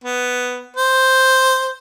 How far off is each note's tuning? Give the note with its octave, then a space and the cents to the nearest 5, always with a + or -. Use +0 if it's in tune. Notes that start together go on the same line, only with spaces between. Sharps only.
B3 +5
C5 +0